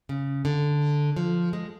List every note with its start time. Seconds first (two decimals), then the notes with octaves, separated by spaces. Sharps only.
0.09 C#3
0.45 D3
1.16 F3
1.53 G#3